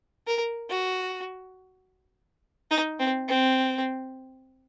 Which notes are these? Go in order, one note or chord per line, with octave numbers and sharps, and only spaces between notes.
A#4
F#4
D#4
C4
C4